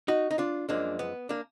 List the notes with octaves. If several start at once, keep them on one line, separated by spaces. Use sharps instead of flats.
D#4 F#4
D#4
D4 F4
F#2 F3 G#3 A#3 D4
B3
A#3 D4